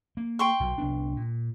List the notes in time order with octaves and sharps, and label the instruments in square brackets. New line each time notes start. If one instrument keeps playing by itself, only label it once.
[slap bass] A#3
[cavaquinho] G5 C6 C#6
[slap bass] B1 B2
C2 B3 D4
A#2